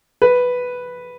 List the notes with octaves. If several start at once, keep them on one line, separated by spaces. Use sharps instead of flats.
B4